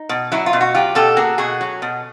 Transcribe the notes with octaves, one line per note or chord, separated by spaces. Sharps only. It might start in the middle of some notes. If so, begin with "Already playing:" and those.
Already playing: D#4
B2
F#3 E4
F4
B2
F#4
F#3 F4 G4
B2 G4 A4
A#3 F#4 G#4
B2 F#4 G#4
F#3
B2